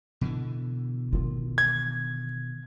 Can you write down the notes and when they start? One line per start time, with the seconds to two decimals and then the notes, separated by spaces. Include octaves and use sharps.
0.21 B2 D3 E3
1.13 D#3 F4
1.58 G#6